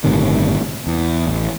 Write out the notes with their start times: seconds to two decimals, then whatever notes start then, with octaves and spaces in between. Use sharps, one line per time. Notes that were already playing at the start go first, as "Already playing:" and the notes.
0.04 G1 A2 C3 D#3
0.87 E2
1.27 A1